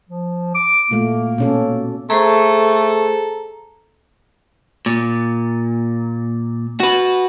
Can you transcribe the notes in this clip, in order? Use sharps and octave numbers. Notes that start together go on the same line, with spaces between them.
F3
D6
A#2 A3 A#3
B2 C#4 A4
A3 G#4 A4 C5 A#5
A#2
F#4 B4